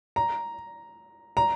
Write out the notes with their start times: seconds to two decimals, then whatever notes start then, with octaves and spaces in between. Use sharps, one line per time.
0.16 A#5
1.37 A#5